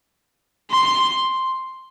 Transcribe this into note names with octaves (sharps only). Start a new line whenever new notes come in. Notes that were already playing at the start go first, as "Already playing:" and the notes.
C6